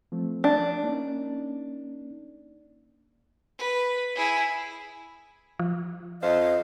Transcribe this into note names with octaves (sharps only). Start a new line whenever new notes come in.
F3 A3 C4
D4
A#3 C#4 D#4
B4
E4 G#4
F3
F2 C5 D#5 F5